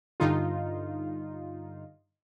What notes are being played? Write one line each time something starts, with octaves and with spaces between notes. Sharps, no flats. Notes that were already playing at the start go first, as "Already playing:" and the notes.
G2 D3 D#4 F4